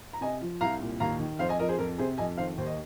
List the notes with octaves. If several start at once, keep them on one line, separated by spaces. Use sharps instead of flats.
A#5
C3 D#5 G#5
F3
C2 F5 A#5
A#2
D#2 F5 A#5
D#3
F2 C5 F5
D#5 G#5
F3 A#4 D#5
G#4 C5
F2 A#4
C3 G#4 C5
F2 D#5 G#5
D#3 C5 F5
D#2 C5
D#5